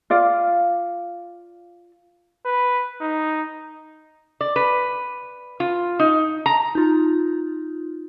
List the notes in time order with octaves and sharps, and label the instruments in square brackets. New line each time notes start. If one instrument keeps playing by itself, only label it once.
[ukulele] F4 D5 F5
[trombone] B4
D#4
[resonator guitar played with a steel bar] D5
B4
F4
D#4
A#5
[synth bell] D#4 F4